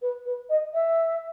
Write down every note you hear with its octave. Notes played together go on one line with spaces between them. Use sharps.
B4
B4
D#5
E5